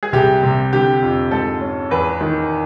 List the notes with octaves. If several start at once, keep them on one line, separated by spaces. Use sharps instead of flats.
G#4
C2 G4
C3
D3 G4
F2
G#2 A4
C#4
E2 B4
D#3